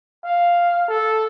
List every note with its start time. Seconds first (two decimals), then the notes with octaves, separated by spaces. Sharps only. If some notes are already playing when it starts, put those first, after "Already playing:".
0.24 F5
0.89 A4